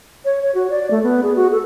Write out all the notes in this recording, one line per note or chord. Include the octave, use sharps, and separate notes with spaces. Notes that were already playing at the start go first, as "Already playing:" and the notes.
C#5
C#5
F#4
D5
A3
B3
G#4
F#4
A4